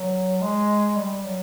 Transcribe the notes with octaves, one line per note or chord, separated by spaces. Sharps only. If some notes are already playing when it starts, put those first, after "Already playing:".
Already playing: F#3
G#3
G3
F#3